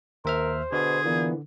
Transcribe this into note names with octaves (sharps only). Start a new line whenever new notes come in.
D#2 A#4 C5 E5 F6
B2 D3 G#4
A#2 E3 B3